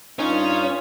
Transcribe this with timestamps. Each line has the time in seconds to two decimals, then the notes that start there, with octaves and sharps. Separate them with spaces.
0.19 G2 C#4 D#4 F4